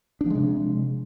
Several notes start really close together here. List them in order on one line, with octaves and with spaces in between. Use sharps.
D4 F3 G#3 C3